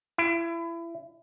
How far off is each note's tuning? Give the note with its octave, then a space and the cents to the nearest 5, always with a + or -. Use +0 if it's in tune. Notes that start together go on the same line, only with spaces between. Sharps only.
E4 +30